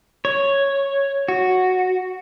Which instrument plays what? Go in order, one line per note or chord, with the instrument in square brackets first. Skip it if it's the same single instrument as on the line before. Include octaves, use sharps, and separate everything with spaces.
[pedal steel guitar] C#5
F#4